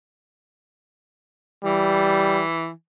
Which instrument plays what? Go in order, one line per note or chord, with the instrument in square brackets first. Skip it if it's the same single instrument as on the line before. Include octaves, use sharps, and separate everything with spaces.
[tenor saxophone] E3 [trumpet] G3